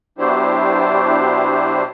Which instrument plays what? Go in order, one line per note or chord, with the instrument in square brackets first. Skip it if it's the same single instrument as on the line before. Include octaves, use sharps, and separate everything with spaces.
[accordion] B2 F#3 D4 E4 G4 C5